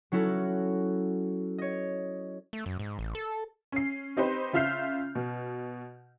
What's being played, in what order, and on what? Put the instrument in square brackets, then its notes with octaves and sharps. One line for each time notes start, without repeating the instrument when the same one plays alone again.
[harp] F#3 C#4 E4 F#4 A4
C#5 D#5
[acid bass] A3
F#2
G#2
A1
A4
[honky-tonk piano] C#4 C7
C4 D#4 G4 B4 C5
C#3 F4 E5 F6 G6 C7
B2